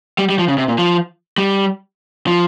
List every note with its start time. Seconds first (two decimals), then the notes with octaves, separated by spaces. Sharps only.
0.18 G3
0.29 G3
0.39 F3
0.48 C#3
0.58 C3
0.68 A#2
0.78 F3
1.38 G3
2.27 F3